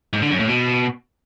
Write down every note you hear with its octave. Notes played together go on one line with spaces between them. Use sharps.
G#2
D3
F#2
A2
B2